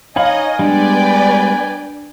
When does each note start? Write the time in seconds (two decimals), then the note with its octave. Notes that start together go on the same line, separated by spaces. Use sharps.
0.16 D#4 C#5 D#5 F5 G#5 B5
0.59 G3 G#3 B3 D4 B4 D5 G5